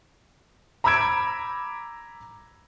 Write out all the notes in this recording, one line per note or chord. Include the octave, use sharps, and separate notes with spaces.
A#5 B5 D6 E6 G#6 D7